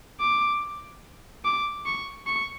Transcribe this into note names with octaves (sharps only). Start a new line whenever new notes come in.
D6
D6
C#6
C#6